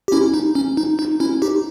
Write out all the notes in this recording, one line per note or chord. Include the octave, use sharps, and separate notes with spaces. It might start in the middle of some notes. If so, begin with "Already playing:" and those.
G4
C#4 E4
D#4
C#4
D#4
D#4
C#4 E4
D#4 G4